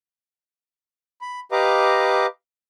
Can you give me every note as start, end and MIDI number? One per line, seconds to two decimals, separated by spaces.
1.21 1.40 83
1.52 2.26 67
1.52 2.26 71
1.52 2.26 75
1.52 2.26 77
1.52 2.26 82
1.52 2.26 86